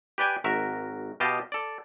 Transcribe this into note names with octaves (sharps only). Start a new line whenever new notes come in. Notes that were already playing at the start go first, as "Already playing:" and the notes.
G4 B4 D5 G5 G#5
G#1 F#4 A#4 E5
B2 G4 D#5 F5 A5
A4 D5